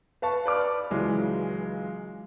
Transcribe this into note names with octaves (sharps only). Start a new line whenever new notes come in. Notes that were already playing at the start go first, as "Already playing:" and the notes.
B4 F5 A5 C#6
B4 D5 D6 F6
C#2 E3 F#3 G#3